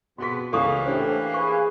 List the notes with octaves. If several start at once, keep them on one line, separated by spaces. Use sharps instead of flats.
F2 B2 B3 F#4 G#4 C6 B6
C#2 E3 A#3 C#4 A4 C#6 D#6
A2 C#4 D4 G4 C5
G#4 B4 F5 C#6